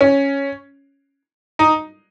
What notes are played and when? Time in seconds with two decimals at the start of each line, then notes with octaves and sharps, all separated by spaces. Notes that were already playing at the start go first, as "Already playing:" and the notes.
0.01 C#4
1.59 D#4